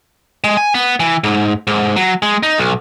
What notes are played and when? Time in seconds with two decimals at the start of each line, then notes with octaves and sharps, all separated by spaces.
0.44 G#3
0.57 G#5
0.74 B3
1.00 E3
1.24 G#2
1.67 G#2
1.96 F#3
2.22 G#3
2.43 D#4
2.58 B1